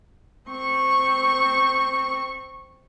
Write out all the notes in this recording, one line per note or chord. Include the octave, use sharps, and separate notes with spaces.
C4 C#6